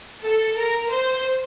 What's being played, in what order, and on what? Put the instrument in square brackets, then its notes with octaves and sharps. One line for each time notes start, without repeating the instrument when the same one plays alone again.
[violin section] A4
A#4
C5